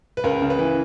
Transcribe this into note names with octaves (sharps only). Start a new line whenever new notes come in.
B4
C#2 A#4
C#3
B4
E3